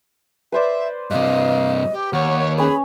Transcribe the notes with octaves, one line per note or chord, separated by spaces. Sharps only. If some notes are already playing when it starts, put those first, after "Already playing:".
B4 C5 D5 E5
G2 C3 D#5 F5
G4
D#2 C#5 F#5
C#4 G#4 C#5 B5